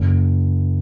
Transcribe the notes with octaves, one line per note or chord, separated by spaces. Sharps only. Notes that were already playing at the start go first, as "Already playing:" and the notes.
Already playing: F#1